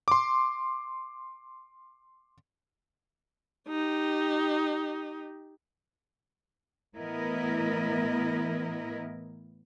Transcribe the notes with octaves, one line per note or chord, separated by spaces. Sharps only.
C6 D6
D#4 G4
A2 E3 B3 E4 A#4 D#5